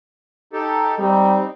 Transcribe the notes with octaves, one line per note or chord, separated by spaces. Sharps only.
D#4 G4 A4
G3 C4 D#4